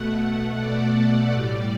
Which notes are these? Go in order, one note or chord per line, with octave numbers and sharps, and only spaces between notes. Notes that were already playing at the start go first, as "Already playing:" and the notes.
Already playing: B2 A3 F#5
F#5
D5
A2 G3